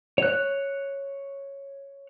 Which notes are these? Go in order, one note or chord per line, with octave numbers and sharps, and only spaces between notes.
C#5 F#6